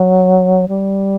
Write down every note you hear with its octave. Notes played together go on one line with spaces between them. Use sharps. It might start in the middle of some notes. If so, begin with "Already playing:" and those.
Already playing: F#3
G3